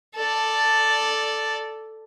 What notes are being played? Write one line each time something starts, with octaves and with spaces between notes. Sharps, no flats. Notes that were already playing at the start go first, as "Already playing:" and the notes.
A4 D5